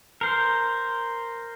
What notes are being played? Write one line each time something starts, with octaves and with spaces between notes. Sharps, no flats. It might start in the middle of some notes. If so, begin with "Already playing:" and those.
A#4 C5